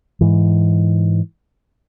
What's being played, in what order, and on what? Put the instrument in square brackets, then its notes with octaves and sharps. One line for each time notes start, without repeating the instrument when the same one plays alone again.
[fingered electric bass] G#2 E3